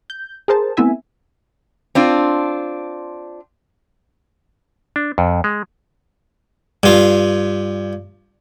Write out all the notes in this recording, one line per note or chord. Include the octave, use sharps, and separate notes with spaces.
G6
G#4 A#4 C5 A5
A3 B3 C4 E4 E5 G#5
C4 D4 F4
D4
F2
G#3
G2 F4